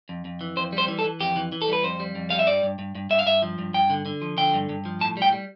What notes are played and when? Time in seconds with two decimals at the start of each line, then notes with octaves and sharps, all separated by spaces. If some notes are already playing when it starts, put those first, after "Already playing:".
0.09 F2
0.25 F2
0.41 E3
0.56 F2 C5
0.73 G3
0.78 C5
0.88 E3
0.99 A4
1.04 E3
1.20 F2 G4
1.36 E3
1.52 E3
1.62 A4
1.68 G3 B4
1.83 F2 C5
2.00 G3
2.15 F2
2.30 G3 F5
2.39 E5
2.47 G2 D5
2.63 G2
2.79 G2
2.95 G2
3.10 G2 E5
3.19 F5
3.26 G2 E5
3.42 F3
3.59 G2
3.74 G2 G5
3.90 D3
4.06 D3
4.22 F3
4.37 D3 G5
4.54 G2
4.69 G2
4.85 F3
5.01 A2 A5
5.17 G3 G5
5.32 G3